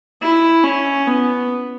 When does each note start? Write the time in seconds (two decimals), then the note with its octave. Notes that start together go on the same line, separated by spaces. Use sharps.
0.22 E4
0.64 C#4
1.07 B3